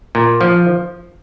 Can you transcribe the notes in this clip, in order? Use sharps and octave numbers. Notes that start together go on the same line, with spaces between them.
A#2
F3